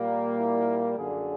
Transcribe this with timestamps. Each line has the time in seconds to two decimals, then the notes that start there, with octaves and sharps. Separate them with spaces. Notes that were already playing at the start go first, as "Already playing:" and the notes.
Already playing: A#2 G3 A#3
0.37 E4
0.97 F#2 D3 F#3 G#4